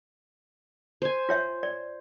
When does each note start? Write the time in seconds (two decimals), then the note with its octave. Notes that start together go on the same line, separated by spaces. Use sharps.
1.02 C5 G#5
1.29 F4 C#5 E5
1.63 D5